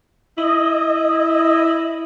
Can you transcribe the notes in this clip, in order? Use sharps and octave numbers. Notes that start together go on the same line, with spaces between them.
E4 D#5